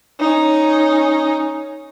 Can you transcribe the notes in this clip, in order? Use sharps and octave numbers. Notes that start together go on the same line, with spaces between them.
C#4 D#4